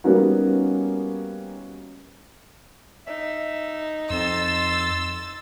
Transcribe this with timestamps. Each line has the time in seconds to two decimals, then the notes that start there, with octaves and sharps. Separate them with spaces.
0.04 G3 A#3 B3 C#4 D#4 F#4
3.07 D#4 E5
4.10 F2 C6 E6 A6